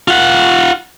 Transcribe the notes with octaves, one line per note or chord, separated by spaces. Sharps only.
F4 F#5